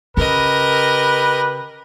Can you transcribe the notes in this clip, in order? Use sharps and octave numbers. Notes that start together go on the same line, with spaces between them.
C#3 G4 A#4 B4 D#5